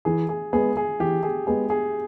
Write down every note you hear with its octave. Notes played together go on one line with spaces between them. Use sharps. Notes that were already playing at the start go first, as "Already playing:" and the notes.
E3 G#4
G#4
G#3 B3 G#4
G#4
E3 G4
G#4
G#3 B3 G#4
G#4